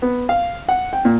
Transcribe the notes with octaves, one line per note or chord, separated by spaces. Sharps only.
B3
F5
F#5
G5
A#2